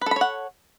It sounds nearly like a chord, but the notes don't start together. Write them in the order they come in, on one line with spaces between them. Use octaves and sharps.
B4 A4 B5 C#5 F#5